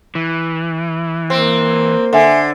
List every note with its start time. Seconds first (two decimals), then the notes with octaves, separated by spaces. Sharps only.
0.15 E3
1.30 A#3 C4
2.13 D3 A4 E5 G#5